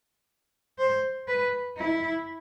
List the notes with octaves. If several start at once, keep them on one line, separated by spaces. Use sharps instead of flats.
C5
B4
E4